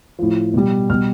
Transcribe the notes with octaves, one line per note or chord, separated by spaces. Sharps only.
A2 F3
B2 G3
B2 G3 F6